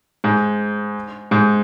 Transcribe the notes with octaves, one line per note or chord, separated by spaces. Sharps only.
G#2
G#2